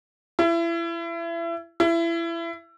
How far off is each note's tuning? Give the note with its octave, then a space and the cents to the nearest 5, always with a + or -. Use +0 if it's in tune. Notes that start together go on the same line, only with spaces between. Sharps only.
E4 +30
E4 +25